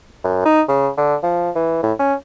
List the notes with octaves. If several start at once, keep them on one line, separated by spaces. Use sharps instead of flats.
F#2
D#4
C#3
D3
F3
E3
A2
C#4